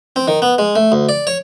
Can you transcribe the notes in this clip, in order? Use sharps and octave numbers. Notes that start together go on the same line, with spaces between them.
C4
D#3
B3
G#3
A3
D2
D5
C#5